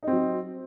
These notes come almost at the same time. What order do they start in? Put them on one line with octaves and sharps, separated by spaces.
D#4 C4 F#3